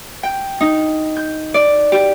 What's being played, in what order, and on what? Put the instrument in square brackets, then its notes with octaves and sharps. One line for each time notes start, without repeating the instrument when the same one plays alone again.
[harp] G5
D#4
G6
D5
G4